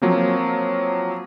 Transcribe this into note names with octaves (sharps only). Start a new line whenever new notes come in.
F3 F#3 A#3 C4